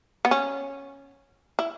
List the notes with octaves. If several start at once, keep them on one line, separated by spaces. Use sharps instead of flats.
B3
C#4
E4